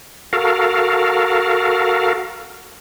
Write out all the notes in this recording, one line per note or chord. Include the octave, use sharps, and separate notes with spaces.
F#4 A4 A#4 F5